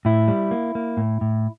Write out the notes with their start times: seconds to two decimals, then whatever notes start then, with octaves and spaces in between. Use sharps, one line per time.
0.05 A2 E4
0.28 G3
0.51 A#3
0.75 A#3
0.97 A2
1.21 A2